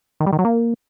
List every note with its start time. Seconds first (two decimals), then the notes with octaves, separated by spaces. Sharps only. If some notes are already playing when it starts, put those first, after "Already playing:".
0.20 D#3
0.26 G3
0.33 D#3
0.39 F#3
0.45 A#3